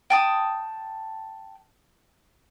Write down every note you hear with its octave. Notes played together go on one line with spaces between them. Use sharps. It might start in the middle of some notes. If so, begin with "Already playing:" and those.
G5 A5 D#6